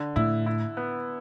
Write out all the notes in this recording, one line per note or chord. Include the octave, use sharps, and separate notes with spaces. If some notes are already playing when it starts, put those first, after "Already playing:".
Already playing: D3
A2 E4
E4
B3